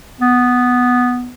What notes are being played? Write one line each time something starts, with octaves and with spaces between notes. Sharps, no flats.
B3